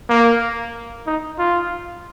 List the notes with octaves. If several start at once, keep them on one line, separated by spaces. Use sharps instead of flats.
A#3
D#4
F4